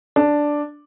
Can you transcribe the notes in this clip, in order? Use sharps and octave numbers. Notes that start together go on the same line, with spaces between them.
D4